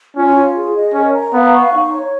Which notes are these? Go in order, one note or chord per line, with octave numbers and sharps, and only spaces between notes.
C#4 F4
F4
G#4
D#5
C#4 A#4
A#5
B3 F5
C#6
D#4
C#5